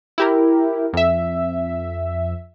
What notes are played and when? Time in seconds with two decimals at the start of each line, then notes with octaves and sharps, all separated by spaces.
0.18 E4 G4 A#4
0.93 F2 E5